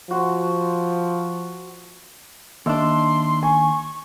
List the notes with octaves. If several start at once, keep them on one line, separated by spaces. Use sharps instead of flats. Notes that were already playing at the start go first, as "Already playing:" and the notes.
F3 F#4 C6
D#2 D4 D#5 E5 C6 E6
G#5 C#6